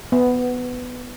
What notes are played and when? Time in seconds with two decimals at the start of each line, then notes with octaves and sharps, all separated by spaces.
0.12 B3